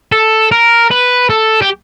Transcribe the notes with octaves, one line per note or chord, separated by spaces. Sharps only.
A4
A#4
B4
A4
G4